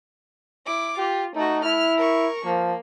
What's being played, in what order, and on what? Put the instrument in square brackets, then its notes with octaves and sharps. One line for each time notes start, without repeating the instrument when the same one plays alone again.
[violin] E4 D6
[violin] F4 [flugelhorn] G4
[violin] A3 F#4 [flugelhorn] D#4
[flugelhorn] E4 [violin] F6
[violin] A#4 C#6
[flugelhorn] F3 [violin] A#3